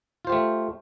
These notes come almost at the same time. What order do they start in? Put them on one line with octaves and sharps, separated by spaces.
F4 C5 G4 A3